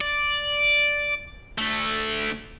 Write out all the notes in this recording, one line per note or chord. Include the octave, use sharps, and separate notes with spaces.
D5
D2 A3